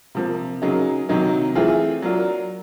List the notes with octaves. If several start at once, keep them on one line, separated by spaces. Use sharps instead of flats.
C3 F3 A#3
C#3 F#3 A#3 D#4 G#4
C3 D#3 F#3 A#3 D#4
E3 A3 C4 F4 G#4
F#3 A#3 D4 F4 A#4